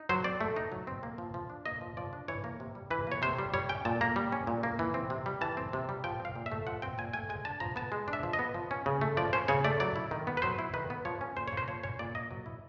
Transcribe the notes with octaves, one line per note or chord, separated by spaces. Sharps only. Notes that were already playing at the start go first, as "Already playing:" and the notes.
Already playing: D#4
F#3 C5
C4 D5
A3
D#4
F#3
C4
A#3
F3
F3
D4
A#3 D#5
F3
F3 D5
D4
E3 C#5
A#3
C3
G3
E3 B4
A#3 C#5
C3 C5
G3
G3 C#5
C#4 G5
A#2 A5
A#3 A#5
G3
C#4
A#2
A#3
E3
C4
C3
G3
E3 A5
C4
C3
G3
F3 G5
C4
F5
A#2
E5
A3
F3 F#5
C4 G5
A#2 G#5
A3 G#5
G#3 G#5
D4 A5
F3 A#5
B3 A5
G#3
D4
E5
F3
D#5
B3
F3
C#4
C#3
A3
F3 D5
C#4 C5
C#3 C#5
A3 D5
F#3 D5
E4
D#3
B3
B4
F#3 C5
E4
D#3 B4
B3
F3 C#5
C#4
A#2 C5
A#3 C#5
C5
F3 C#5
C#4 C#5
A#2 D5
A#3 D#5
F#3
E4